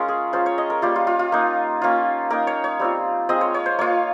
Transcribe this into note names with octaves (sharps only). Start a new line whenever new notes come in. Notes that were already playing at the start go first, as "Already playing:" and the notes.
Already playing: G#3 C#4 F4 A#4
G#4
G#3 C#4 F4 C5
C#5
D#5
A#4
G3 A#3 F4 G4
F4
F4
F4
A#3 D#4
A#3 C#4 F4
A#3 D#4 A#4
C#5
C#5
G3 C4 F4
G#3 C4 F4 D#5
C#5
C#5
C5
A#3 F4 C#5